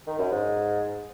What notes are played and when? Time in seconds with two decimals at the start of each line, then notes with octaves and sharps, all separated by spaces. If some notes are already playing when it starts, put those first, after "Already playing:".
0.07 D#3
0.19 F#2
0.31 G#2